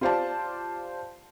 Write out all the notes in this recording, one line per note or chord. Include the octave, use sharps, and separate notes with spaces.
F4 G4 C5 D5 F5 A5